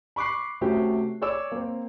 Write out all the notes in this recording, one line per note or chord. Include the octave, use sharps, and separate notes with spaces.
B5 C#6 D6 F#6 C7
C3 A3 C#4 F#4 G4
G#4 C#5 D5 D6 E6
A#3 C4